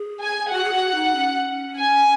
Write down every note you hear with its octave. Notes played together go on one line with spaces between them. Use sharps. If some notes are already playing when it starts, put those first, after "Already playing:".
Already playing: G#4
G#5
F#4 F#5
G#4
F#4
D#4
C#4
G#5